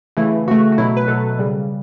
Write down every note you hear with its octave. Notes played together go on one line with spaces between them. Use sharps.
C#3 E3 A3 E4
C#3 E3 A3 F#4
F#4
B2 F#3 A3 E4
B4
B2 F#3 A3 A4
C#3 G3